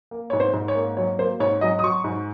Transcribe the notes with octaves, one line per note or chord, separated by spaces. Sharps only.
A#3
G#2 C#5
C5
G#2
C#5
A#3
F#3 C#5
A#3 C5
G#2 C#5
F#3 D#5
D#6
F#3 C#6
G#2